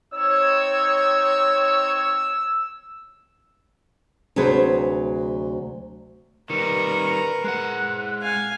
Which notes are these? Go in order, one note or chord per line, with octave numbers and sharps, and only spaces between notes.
C4 D#4 C#5 E6
D2 C3 F#3 G#4 B4 C5
D#3 G3 A#4 B4 C#7
G#3 F#5 F#6
F5 G#5